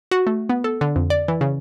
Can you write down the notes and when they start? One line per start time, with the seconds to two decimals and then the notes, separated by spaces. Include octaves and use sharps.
0.11 F#4
0.27 A3
0.49 B3
0.64 A4
0.81 D3
0.96 F2
1.10 D5
1.28 E3
1.41 C#3